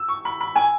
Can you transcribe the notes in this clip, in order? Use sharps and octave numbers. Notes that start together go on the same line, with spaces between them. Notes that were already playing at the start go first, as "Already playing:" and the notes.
Already playing: E6
C#6
B5
B5
G#5